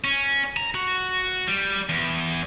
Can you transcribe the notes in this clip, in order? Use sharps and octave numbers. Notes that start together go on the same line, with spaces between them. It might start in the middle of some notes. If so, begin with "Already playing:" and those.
C#4
A#5
F#4
G3
E2